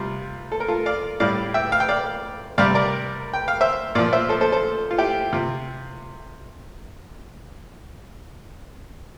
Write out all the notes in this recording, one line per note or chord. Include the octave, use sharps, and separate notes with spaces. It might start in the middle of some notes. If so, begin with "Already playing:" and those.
Already playing: C3 G3 F4
A4
A#4
F4 A4
D5 F5
A2 G3 D5 F5
E5 G5
F5
G5
D5 F5
C3 G3 D5 F5
A#4 D5
G5
F5
C5 E5
A#2 F3 D5 F5
C5 E5
A4 C5
A4 C5
A4 C5
F4
E4 G4
C3 F4